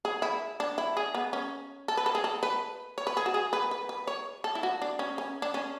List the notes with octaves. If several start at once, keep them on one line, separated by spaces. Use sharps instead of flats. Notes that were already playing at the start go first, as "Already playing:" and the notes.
G#4
E4
D4
E4
G#4
B3
C#4
A4
B4
A4
G#4
A4
B4
C#5
B4
G#4
F#4
G#4
B4
B4
B4
C#5
A4
E4
F#4
D4
C#4
C#4
D4
C#4